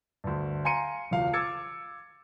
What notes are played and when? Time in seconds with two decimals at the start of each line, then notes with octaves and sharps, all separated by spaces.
0.24 D2 G2
0.65 F5 G#5 A#5 C6 C#7 D#7
1.11 E1 C#2 F5
1.33 D6 E6 G#6 A6 C#7